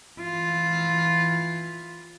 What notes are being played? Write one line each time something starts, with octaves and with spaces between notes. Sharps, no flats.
E3 F4